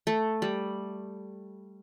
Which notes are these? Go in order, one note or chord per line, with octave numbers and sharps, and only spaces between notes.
A3
G3